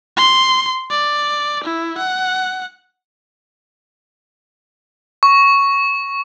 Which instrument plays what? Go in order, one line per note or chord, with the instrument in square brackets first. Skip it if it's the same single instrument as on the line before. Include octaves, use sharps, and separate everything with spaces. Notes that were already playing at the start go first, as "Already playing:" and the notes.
[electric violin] C6
D5
E4
F#5
[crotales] C#6